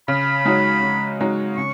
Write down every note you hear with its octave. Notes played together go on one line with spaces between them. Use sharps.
C#3 B5
G#3 D#4 F#4 C#5
C#3
G#3 D#4 F#4 C#5
C#3 C#6